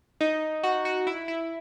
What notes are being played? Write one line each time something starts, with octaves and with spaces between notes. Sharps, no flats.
D#4
F#4
F#4
E4
E4